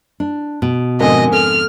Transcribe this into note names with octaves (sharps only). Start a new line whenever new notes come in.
D4
B2
F2 G#2 D3 A#4 D#5 G#5 D#6
A4 F6